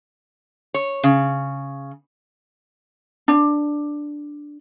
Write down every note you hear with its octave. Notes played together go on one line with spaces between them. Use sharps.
C#5
C#3
D4